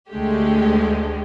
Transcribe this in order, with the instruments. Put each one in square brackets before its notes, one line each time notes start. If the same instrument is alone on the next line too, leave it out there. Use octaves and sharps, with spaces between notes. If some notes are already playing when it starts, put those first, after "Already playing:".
[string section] D2 D3 G#3 A3 G4